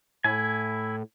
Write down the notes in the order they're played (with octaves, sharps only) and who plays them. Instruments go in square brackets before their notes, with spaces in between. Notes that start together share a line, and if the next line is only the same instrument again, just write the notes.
[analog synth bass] A2 [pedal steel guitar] E4 G#5